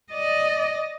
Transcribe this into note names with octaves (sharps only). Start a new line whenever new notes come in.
D5 D#5